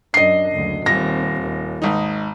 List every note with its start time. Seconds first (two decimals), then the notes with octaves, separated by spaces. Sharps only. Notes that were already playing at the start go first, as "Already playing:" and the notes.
0.14 F#2 D4 D#5 C7
0.51 F#1 D2
0.86 D#1 D#2 C4 A#6
1.42 D#2
1.82 G#1 D#4